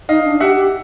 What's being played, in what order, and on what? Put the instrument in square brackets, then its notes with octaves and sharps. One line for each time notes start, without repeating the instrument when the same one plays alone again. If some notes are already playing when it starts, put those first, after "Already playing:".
[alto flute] D#4 [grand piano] D#5 F5
[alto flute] D4
[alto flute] G4 [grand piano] E5 F#5
[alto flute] G4